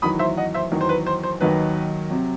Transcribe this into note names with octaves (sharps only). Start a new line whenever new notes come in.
E2 D#3 F#3 B5 D#6
C5 E5
D#5 F#5
C5 E5
E2 D#3 F#3
C5
B4
C5
C5
D#2 D#3 F#3 B4
C3 F#3